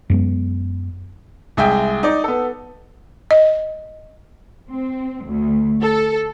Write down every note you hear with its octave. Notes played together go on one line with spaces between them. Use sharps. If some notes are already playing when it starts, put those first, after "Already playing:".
F#2 G#3 B3
C2 G#3 E5 G5
D#4 D5
B3 A4
D#5
C4
D2
A4